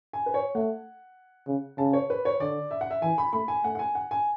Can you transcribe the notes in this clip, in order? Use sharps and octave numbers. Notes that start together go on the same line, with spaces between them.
G#5
B4
C#5
A3 F#5
C#3
C#3 A5
C#5
B4
C#5
D3 D5
E5
F#5
E5
E3 G#5
B5
A3 B5
G#5
A3 F#5
F#5
G#5
F#5
G#5